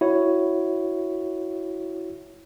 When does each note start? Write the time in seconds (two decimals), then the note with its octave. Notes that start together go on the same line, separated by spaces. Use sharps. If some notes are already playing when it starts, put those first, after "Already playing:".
0.01 E4 F#4 C#5